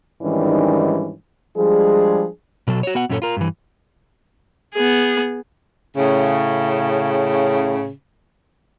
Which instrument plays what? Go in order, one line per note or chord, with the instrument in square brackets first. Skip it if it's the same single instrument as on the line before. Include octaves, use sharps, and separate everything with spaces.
[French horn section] G#2 D#3 E3 G3 C#4 D4
F3 G3 G#3 D4 G#4
[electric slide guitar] B2 F#3 A4
F#4 C#5
B3 F#4 F#5
F#2 A#2 C#4 D4 A4 C#5
F4 A#4
G2 E3
[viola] B3 G#4
[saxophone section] A2 C#3